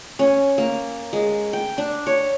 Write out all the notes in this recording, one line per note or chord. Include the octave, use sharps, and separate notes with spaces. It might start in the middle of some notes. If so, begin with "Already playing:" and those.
C#4
A#3
G#3
G5
D4
C#5